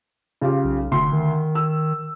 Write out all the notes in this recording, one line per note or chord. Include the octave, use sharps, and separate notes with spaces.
C#3 F4 G4
B1
F1 D2 C6
D#3
E6